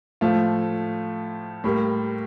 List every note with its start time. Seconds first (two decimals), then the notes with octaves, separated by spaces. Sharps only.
0.21 A2 F3 A3 F4
1.64 A2 G3 A#3